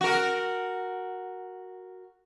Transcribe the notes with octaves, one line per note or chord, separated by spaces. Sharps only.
F#4 A#4